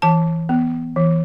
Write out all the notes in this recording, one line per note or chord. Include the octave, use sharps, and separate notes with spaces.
E3 A5
B3
E3